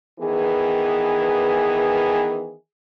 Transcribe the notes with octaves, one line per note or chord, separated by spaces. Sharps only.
D#3 E3 B3 G#4